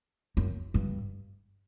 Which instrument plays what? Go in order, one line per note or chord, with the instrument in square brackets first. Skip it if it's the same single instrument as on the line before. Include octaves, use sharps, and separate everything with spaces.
[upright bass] F#2
G2